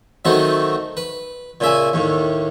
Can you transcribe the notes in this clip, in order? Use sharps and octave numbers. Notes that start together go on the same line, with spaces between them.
D#3 F#3 A3 C4 D#4
B4
A#2 C#3 E5 G#5
D#2 A2